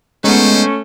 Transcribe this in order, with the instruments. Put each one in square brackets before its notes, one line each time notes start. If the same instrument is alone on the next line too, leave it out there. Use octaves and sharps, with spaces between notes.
[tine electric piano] G#3 [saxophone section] A3 C#4 [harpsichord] B3 D#4 [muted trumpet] C5